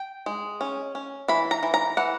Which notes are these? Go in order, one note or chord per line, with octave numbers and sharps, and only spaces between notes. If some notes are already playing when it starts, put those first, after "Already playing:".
Already playing: G5
G#3
C#4
C#4
E3 B5
A#5
E3
A#5
E3 F#5